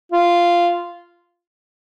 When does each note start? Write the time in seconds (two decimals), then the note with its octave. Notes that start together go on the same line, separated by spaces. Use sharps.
0.12 F4